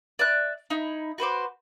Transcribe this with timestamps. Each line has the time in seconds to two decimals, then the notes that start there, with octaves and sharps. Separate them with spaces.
0.19 D5 E5 F#6
0.70 D#4 E4
1.18 F#4 B4 C5 D6